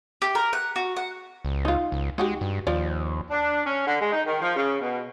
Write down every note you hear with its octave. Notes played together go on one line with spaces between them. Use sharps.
G4
A#4
F#5
F#4
F#5
C#2
D#4 F4
C#2
G#3 D#4 F#4 G4
G2
D#2 F3 D5
D4
C#4
D3
G#3
D#4
D#3
F3
C#3
B2